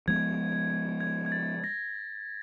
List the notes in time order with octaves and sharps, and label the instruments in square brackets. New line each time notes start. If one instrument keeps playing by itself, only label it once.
[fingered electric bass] F3 G#3 B3 [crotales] G#6
[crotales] G#6
G#6
A6
A#6